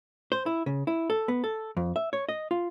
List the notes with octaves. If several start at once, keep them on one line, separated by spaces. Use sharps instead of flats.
C5
E4
C#3
E4
A4
B3
A4
F2
E5
C#5
D#5
F4